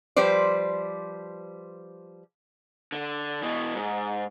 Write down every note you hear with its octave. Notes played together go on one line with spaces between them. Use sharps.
F3 G3 B4 C5 D5
D3
B2 E3
G#2